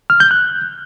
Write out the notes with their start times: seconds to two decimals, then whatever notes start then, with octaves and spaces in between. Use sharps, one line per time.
0.10 F6
0.20 G6
0.31 F#6